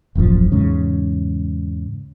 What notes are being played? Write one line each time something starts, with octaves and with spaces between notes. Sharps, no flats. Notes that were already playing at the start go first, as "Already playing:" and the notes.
D#1 A1 F#2 F3
E2 G#2 C#3